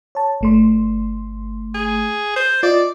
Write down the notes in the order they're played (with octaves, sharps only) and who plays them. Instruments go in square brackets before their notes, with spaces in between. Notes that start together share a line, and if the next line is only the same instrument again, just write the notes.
[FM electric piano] C#5 A5
G1 A3 C6
[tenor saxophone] G#4
C5
[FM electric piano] F4 D#5 [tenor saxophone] D5